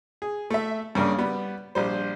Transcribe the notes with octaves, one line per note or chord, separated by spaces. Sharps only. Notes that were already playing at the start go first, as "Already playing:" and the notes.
G#4
A3 E5
G2 C#3 A#3 C#4 D4
G3 B3
A#1 G3 C5